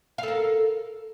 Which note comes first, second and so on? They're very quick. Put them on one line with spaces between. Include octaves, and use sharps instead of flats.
F5 A4 A#4